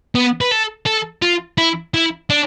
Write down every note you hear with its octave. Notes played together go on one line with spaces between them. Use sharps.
B3
B4
A4
A4
F4
E4
E4
D4